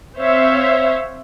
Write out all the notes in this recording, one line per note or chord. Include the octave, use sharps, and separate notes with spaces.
C4 C5 C#5 E5 F5